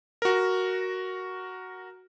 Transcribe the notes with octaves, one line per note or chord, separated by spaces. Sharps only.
F#4 A#4